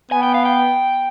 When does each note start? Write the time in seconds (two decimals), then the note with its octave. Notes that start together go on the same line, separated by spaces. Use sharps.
0.11 B3 G#5
0.23 G5
0.34 F5
0.45 G5